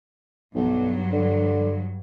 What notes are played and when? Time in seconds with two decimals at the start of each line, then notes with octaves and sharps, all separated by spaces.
0.55 B1 G2 F#3
1.12 D3